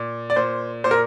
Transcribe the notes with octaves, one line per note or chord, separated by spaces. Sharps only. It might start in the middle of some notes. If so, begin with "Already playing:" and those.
Already playing: A#2
D5
A#2 C5
A#2 C5
A#4